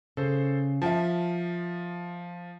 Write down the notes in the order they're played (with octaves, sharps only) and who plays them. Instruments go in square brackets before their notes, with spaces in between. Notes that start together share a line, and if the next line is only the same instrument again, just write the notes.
[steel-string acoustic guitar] C#3 [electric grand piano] A4 C5
[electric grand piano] F3 [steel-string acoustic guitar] E5 G5 A5